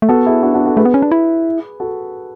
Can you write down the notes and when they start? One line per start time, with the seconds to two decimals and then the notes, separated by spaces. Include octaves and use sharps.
0.02 A3
0.09 B3 F#4 A4
0.26 E4 G#4
0.43 D4 F#4
0.54 D4 F#4
0.66 F#4 A4
0.77 A3 G#4 B4
0.85 B3
0.94 C#4
1.02 D4
1.11 E4
1.80 F#4 A4